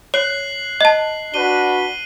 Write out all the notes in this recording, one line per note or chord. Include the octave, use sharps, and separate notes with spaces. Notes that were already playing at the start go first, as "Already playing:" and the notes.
C#5 F#6 C7 F#7
D#5 A5
D4 F#4 B4 D#7 G7